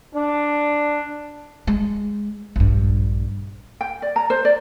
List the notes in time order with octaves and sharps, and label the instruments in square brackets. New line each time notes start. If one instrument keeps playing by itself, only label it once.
[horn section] D4
[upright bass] G#3
A#1 G2
[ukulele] G5
D5
A#5
C5
D5